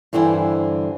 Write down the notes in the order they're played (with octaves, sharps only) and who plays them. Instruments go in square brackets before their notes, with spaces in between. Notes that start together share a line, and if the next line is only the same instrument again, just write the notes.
[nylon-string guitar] G2 D3 E3 C5 G5 G#5